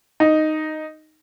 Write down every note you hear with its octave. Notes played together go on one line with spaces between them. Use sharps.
D#4